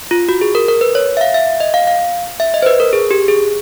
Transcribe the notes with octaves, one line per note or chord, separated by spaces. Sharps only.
F4
F#4
G#4
A#4
A#4
B4
C#5
E5
F5
E5
D#5
F5
F5
E5
D#5
C5
B4
A#4
G#4
G4
G#4